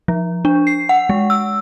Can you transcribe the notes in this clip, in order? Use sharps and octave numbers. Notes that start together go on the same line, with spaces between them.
F3
D4
C7
F#5
G#3
E6